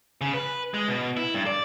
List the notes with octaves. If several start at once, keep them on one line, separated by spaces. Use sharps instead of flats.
C#3
B4
G#3
B2
E4
G2
D5